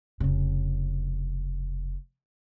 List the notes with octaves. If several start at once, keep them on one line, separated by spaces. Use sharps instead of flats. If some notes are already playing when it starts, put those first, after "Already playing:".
F1 C#3